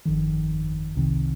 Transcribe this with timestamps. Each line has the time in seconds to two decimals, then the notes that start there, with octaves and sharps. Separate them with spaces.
0.06 G1 F2 D#3
0.95 C2 C3 D#3